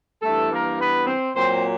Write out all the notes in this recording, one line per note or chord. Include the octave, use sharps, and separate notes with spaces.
G2 E3 A3 A4
A#3 A#4
B3 B4
C4 C5
A#2 F#3 C4 C5